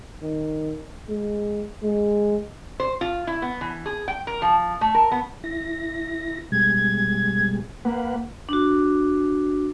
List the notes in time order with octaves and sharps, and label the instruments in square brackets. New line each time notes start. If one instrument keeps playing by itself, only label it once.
[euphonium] D#3
G#3
G#3
[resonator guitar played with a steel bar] C5
F4
E4
B3
E3
G#4
G5
A#4
F3
A3
A#4
B3
[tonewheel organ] E4 A#6
[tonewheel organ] B2 G3 G#3 [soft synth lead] G#6
[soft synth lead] A#3 [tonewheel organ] B4 F#5
[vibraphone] D4 F#4